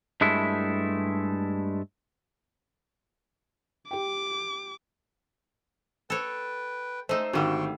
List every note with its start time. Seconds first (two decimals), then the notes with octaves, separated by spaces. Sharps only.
0.21 G2 G#3 A3 E4
3.91 G4 G5 D6
6.10 A4 B4 C#5 G5
7.09 G#3 A3 D#4 C5 E6
7.33 G#1 D3 G3 F#4 G5 C6 C#6 E6